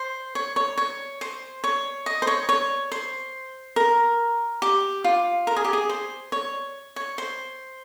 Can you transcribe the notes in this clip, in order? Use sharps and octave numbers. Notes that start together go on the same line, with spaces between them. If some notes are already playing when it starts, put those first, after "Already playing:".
Already playing: C5
C#5
C#5
C#5
C5
C#5
D#5
C5
C#5
C#5
C5
A#4
G4
F4
A#4
G#4
G4
G#4
C5
C#5
C#5
C5